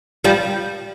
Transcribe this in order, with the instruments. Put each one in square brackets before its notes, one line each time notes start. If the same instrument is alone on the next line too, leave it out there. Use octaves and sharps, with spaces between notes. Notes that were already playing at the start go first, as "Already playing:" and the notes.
[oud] F3 G3